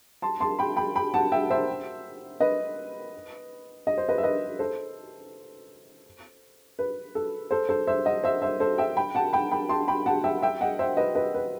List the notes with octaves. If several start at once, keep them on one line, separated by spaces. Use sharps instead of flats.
A5 C6
A5 C6
G5 B5
G5 B5
G5 B5
F#5 A5
E5 G5
C5 E5
B4 D#5
D#5
C5
B4 D#5
E5
B4 D#5
A4 C5
B4
A4
A4 C5
A4 C5
C5 E5
D#5 F#5
C5 E5
C5 E5
A4 C5
E5 G5
G5 B5
F#5 A5
G5 B5
G5 B5
A5 C6
G5 B5
F#5 A5
E5 G5
E5 G5
D#5 F#5
C5 E5
B4 D#5
B4 D#5
B4